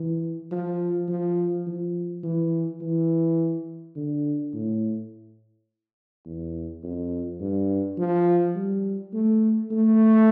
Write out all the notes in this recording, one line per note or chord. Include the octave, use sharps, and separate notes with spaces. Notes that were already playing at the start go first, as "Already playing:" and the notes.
Already playing: E3
F3
F3
F3
E3
E3
D3
A2
E2
F2
G2
F3
G3
A3
A3